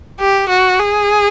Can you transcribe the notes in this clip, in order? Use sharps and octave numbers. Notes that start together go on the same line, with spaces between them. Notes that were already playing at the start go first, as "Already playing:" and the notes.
G4
F#4
G#4